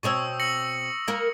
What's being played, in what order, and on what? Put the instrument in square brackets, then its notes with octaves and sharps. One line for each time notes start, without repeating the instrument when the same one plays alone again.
[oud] B2 C4 C#5 [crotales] C#6 D#6 E6
[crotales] A#6 C#7 F#7
[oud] A#3 A#4